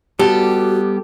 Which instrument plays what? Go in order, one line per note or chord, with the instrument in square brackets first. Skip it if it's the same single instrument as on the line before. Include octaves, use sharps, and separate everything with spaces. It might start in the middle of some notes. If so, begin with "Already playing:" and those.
[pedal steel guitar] G3 B3 [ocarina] F#4 [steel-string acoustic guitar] G4 [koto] A4